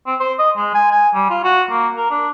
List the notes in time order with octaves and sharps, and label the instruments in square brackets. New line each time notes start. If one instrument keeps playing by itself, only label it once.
[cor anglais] C4
C5
D#5
G#3
G#5
G#5
G3
F4
F#4
A#3
A#4
D4